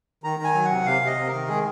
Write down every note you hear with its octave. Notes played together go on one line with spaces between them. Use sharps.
D#3 A#5
D#3 G#5
F#3
F#5
C3
C3 F5
C3 D#5
C3
A#4
D#3
G#3 G#4